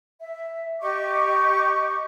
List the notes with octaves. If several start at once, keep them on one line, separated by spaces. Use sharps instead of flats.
E5
G4 D#5 C#6 D6